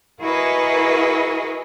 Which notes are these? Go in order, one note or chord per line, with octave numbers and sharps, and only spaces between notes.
E4 F#4 G#4 A#4 B4 D#5